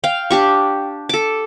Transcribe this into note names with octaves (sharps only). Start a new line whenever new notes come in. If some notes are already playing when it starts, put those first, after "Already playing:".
F5 G5
D4 G4 C#6
A4 D6